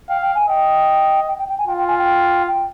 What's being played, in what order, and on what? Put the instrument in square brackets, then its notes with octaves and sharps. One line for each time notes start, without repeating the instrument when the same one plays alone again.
[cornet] F5 [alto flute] G5
[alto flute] G5
G#5
[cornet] D#5 [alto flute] G5
[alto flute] G5
G5
G5
G#5
[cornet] F4 [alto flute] G5
[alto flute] G5
G#5
G5
G5